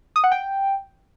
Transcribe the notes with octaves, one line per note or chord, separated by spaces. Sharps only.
D#6
F#5
G5